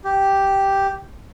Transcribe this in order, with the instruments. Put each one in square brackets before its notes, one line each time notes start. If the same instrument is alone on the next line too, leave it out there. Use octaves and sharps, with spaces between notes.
[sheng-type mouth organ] G4